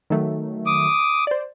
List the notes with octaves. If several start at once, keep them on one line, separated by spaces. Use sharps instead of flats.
D#3 F#3 A3
D6 D#6
C5 D5